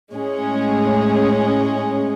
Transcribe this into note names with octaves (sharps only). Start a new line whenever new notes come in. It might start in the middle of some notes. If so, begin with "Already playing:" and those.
A2 G#3 C#4 G#4